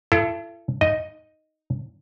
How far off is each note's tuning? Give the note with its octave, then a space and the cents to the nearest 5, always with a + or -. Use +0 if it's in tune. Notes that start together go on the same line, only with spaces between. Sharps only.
E4 +45 A4 +0
D#4 +5 D#5 +0